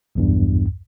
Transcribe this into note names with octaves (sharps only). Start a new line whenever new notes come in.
B1 E2 G2